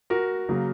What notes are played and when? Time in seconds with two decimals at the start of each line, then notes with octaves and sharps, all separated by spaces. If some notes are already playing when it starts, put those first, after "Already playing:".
0.10 F#4 A#4
0.49 C#3 F#3 A#3